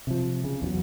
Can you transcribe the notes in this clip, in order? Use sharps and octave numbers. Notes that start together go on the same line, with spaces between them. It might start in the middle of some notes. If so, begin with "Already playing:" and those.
C3 F3
C#3
E2 F3 F#3